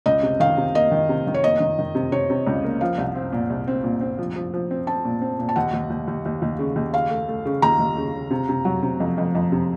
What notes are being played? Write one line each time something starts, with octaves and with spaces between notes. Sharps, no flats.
C#2 D#5
C3
D#3 F5
C3
A#3 D#5
D#3
C3
D#3
C#5
A#3 D#5
D#3
D#3
C3
C3 C#5
C3
C#2
A#3
F3 F5
C2
C4
A#2
C2
C4
A#2
C4
F3
F3
F3
C4
C4 A5
A#2
C4
A#2
A5
D#2 F#5
D#2
D#2
D#2
D#2
D#2
C#3
D#2
C#3 F5
A3
A3
C#3
D#2 A#5
D#2
C#3
C#3
C3
C3
F#3
C3
F2
F2
F2
C3